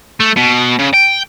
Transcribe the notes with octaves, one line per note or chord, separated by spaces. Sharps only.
A3
B2
C#3
G5